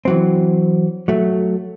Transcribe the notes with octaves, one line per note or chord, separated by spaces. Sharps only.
E3 F#3 C4
F#3 A3